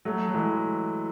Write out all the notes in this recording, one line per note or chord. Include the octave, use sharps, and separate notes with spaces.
F#3 A3
F#3
E3 G#3